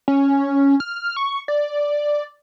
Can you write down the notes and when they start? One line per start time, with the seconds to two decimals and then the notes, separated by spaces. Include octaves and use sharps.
0.08 C#4
0.80 F6
1.16 C#6
1.48 D5